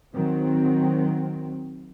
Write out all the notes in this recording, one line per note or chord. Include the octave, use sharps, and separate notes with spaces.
D#3 F#3 C4